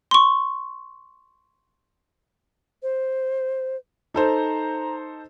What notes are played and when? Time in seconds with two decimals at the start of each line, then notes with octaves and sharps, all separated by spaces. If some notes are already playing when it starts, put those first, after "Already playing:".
0.11 C6 C#6
2.82 C5
4.14 D#4 A4 C5 A#5